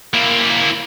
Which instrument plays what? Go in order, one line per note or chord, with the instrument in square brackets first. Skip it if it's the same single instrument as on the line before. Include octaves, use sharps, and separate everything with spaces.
[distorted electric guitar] A#3 E4